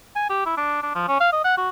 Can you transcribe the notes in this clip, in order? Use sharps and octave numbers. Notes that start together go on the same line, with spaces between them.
G#5
G4
E4
D4
D4
F3
C#4
F5
D#5
F#5
F#4